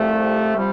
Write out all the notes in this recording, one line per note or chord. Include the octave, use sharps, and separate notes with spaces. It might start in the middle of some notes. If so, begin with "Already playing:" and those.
Already playing: C2 C3 F3 A3
C3 F3 G3